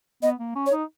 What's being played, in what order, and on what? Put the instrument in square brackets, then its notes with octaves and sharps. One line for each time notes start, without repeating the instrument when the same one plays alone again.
[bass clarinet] B3 [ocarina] D#5
[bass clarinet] A#3
C#4
[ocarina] C#5
[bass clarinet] D#4